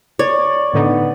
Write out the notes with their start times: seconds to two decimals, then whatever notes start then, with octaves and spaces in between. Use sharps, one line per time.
0.19 C#5 D5
0.73 A2 D3 B3 D#4